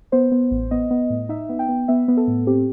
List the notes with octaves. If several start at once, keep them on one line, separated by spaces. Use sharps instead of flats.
B3 C5
B3
A1
B3 D#5
B3
A2
D#4 E5
B3
G5
B3
B3 E5
B3
A4
A2
C4 G4